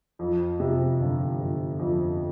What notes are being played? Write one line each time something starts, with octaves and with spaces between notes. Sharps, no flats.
F2
C3
G1
G1
F2